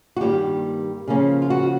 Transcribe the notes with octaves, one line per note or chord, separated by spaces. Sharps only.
F#4
G2 D#3 G3 A#3 G4
C#3 F3 A#3 C#4
F4
F#4